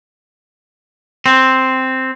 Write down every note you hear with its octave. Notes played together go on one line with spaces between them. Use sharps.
C4